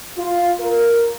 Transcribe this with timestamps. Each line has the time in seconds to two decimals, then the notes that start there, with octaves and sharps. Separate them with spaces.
0.18 F4
0.60 A#4